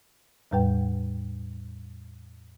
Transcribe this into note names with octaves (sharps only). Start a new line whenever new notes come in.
E2 A2 G3 B4 G5